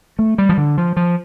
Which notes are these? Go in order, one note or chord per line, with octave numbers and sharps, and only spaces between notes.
A3
G3
F3
D3
F3
F3